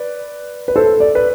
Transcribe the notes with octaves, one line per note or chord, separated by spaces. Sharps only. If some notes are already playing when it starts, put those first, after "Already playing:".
Already playing: B4 D5
B4
A4 C5
D5
B4 D5